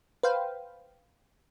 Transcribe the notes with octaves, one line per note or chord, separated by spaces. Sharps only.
B4 C5 F5 G5